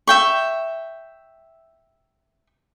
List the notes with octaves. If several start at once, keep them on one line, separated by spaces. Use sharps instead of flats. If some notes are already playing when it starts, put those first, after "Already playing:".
E5 G5 C#6